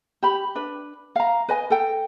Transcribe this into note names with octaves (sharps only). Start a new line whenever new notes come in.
G4 B5
D4 B4
F5 A#5
B4 D#5 G#5
A4 G5